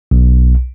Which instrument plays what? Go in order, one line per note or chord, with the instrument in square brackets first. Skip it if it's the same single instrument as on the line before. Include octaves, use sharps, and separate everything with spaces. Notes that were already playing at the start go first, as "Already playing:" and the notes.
[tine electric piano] B1